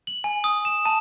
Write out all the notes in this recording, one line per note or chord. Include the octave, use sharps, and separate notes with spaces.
F#7
G#5
D#6
E7
A5